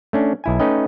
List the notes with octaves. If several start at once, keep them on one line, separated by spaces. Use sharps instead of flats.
A3 C#4 D4
B1 E4 G#5
A3 C#4 D#4 B4 D#5 G5